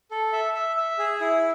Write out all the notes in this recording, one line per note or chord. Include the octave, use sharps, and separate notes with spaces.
A4
E5
E5
E5
G#4
E4